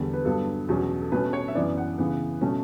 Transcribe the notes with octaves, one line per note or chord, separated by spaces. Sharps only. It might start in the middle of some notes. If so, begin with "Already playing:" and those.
Already playing: E2 D3 G3
B4
G2 F#3 B3 A4
E2 B2 F#3 C#4
A4
B2 A3 C#4 B4
C#5
E5
F#2 E3 B3 D5
F#5
C#3 E3 B3
B2 A3 C#4